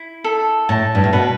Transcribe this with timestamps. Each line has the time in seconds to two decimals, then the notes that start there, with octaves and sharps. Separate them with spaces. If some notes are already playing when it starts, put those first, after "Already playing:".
Already playing: E4
0.24 A4
0.69 A2 A5
0.95 G2
1.04 A2
1.13 B2 B4